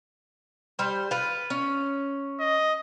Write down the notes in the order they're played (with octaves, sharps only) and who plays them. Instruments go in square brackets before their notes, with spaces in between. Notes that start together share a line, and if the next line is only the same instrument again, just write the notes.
[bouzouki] G3 C5
F4 B4
C#4
[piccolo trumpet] D#5